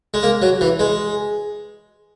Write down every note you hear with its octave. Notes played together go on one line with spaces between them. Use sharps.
G#3
A#3
F#3
E3
G#3